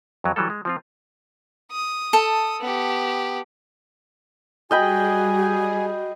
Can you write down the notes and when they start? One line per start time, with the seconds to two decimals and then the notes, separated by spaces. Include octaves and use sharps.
0.24 F2 F#3
0.36 E3 F#3 G3 A4
0.50 G#3
0.65 F3 C4 F4
1.71 D#6
2.13 A4
2.61 B3 G4
4.71 G3 F#4 G#4 D#5 G5 G#5 B5